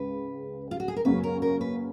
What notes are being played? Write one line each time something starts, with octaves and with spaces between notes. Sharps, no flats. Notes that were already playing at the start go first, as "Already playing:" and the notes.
Already playing: C#2 C#3 B4
F4
F#4
G#4
A#4
F#2 C#3 F#3 A#3 C#4 B4
A#4
A#4
B4